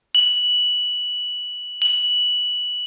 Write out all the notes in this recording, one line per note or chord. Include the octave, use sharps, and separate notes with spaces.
F#7
F#7